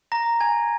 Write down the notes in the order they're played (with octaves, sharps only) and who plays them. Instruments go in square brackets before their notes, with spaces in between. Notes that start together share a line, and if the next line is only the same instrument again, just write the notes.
[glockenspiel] A#5 A#6
G#5 G#6